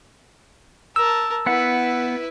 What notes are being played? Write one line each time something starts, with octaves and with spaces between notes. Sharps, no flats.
A#4 A5 E6
B3 E4 B4 F#5